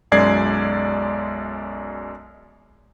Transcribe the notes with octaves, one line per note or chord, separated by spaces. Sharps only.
B1 F#2 G#3 D5 G#6 C7